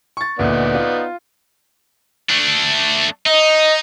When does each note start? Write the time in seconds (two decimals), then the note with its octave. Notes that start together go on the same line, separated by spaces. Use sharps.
0.17 C#6 A6
0.39 D2 A#2 B3 D#4 D5
0.75 F4
2.30 A3 D4
3.26 D#4 D#5